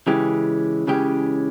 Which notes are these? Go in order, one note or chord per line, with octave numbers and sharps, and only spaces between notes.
C#3 E3 G#3 C#4 G4
C#3 E3 G#3 C#4 G4